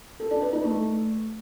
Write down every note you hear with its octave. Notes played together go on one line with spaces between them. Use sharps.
A4
D4
B4
D#4
A3